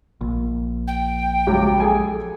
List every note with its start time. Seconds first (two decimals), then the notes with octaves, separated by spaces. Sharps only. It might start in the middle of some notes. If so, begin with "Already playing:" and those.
0.21 A#1
0.88 G5
1.47 C#2 F#3 G4
1.80 G#4 A4 G#5